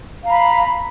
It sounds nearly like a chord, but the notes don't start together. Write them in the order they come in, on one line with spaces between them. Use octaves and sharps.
F5 A#5 B5